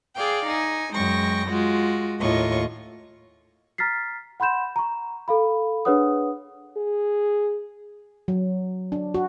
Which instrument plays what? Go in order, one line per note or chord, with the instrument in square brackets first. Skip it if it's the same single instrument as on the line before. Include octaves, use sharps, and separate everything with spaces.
[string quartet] G#4 D5 F5 G5
D#4 G#5
F#2 G#3 G5 C#6 A#6
G#3 F4 F#4
D#2 A2 F4 D#5 C#6
[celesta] A#5 F6 A6 B6 C7
F#5 B5 C6 G6 E7
A#5 C#6
A4 F5 B5
D4 G#4 B4 C#5 F#5 D#6
[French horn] G#4
[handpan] F#3
D4
F#4